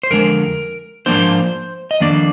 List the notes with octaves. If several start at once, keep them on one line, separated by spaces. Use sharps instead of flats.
C5
F2 D3 G#3 A#4
G#2 F3 A#3 D4 C5
D#5
F2 D#3 A#3 D4 D5